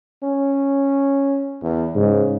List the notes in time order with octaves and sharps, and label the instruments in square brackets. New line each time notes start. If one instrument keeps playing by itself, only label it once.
[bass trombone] C#4
E2
[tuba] G#2 [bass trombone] C#3